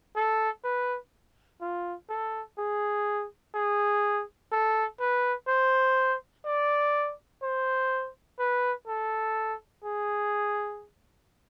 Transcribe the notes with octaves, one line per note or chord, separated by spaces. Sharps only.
A4
B4
F4
A4
G#4
G#4
A4
B4
C5
D5
C5
B4
A4
G#4